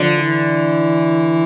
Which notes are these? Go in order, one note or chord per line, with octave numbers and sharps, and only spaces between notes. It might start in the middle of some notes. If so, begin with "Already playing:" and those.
Already playing: D3 F3
E3